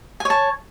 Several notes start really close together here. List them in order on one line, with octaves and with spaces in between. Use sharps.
G#5 C#5 A5